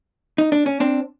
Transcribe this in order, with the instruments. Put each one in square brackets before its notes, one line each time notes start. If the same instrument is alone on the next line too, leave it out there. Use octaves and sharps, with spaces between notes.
[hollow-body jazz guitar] D#4
D4
C#4
C4 D4